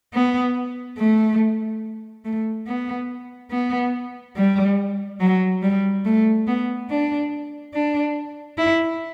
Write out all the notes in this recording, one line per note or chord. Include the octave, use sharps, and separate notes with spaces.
B3
A3
A3
B3
B3
G3
F#3
G3
A3
B3
D4
D4
E4